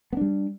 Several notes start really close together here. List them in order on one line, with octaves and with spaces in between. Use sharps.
B3 D4 G3